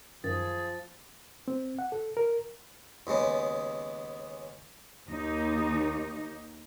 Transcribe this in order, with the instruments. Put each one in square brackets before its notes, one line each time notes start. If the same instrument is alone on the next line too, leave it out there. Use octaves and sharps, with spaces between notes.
[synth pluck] F#2 D#3 [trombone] F3 [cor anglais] G#4 [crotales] A6
[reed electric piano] C4
F#5
A4
A#4
[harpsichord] D#2 C#3 G#3 B3
[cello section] D#2 D#4